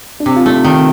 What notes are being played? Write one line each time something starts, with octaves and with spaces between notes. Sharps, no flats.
D4
C3 C4
F4
A3 D#4
D#3 D#4